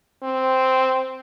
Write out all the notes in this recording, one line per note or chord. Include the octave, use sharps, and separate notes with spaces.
C4